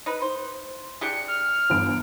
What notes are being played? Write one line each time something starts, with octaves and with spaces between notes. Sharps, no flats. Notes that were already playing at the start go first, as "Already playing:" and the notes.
D#4 B4
C5
D4 G4 G#4 C#7
F6
G1 E2 D7